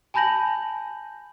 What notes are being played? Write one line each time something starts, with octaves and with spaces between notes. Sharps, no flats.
G#5 A5 B5 G6 A#6 F#7